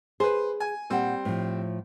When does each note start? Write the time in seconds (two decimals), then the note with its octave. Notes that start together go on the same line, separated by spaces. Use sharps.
0.20 G#4 B4 C5
0.60 G#5
0.90 A#2 G3 C4 F#5
1.25 A2 F3